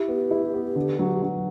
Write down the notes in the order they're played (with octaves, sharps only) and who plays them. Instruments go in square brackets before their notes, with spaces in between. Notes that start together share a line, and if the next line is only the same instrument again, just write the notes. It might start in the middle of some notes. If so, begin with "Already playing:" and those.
Already playing: [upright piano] E4 [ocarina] G4
[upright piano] B3
E4
B3
D3
F#3
F#3